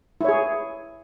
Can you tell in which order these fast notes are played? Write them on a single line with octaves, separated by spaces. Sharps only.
E4 C#5 G#4